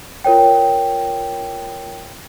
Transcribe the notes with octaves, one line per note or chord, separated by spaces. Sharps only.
F4 A#4 C#5 G5